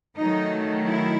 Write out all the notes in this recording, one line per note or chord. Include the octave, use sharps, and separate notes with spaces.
D#3 F#3 A3 D#4
E4